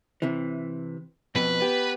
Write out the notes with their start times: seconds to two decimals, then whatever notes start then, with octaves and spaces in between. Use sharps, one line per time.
0.22 C3 E3
1.35 F2 B2 B4
1.60 B3 G4